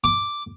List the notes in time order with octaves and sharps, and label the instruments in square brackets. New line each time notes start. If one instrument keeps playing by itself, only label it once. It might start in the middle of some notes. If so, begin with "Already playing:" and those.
[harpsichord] D6